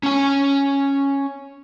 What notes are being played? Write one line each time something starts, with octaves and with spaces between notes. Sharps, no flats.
C#4 G#5